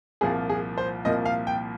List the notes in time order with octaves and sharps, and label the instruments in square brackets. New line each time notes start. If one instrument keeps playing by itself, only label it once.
[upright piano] C2 A#2 F3 A#3 G#4
G#4
C5
C2 A#2 F3 A#3 D#5
F5
G5